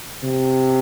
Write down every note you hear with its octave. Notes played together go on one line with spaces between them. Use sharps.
C3